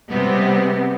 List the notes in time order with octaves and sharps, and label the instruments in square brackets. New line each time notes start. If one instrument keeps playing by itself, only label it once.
[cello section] C3 G3 G#3 B3 C4